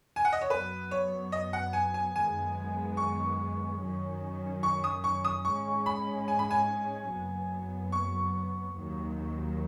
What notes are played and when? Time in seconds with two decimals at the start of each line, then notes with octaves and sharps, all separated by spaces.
0.16 G#5
0.25 F#5
0.32 D#5
0.41 C#5
0.50 F#2 F#3 B3 B4
0.91 C#5
1.32 D#5
1.53 F#5
1.73 G#5
1.94 G#5
2.15 F#2 D#3 G#3 B3 G#5
2.97 C#6
3.80 F#2 D#3 F#3 C#4
4.63 C#6
4.84 D#6
5.04 C#6
5.25 D#6
5.45 G#2 G#3 C#4 C#6
5.86 B5
6.28 G#5
6.39 B5
6.51 G#5
7.10 F#1 F#2 F#3 B3
7.92 C#6
8.75 D#2 D#3 F#3